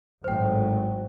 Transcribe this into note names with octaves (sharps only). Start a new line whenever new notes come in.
G#1 A2 F#3 C5 G5